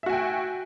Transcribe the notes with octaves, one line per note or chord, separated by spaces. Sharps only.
F#4 E5 G5 G#5